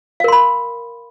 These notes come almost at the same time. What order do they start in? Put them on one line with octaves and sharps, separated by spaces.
F5 A#4 C6 B5